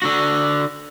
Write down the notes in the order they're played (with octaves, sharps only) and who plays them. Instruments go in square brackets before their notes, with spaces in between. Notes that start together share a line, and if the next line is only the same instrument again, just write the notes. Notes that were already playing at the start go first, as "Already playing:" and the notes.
[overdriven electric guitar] D3 F#4